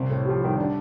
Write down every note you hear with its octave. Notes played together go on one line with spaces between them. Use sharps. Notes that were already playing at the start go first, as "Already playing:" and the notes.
Already playing: C2 C3 C4
A2
F3 G4
D#3 G3
D3 D4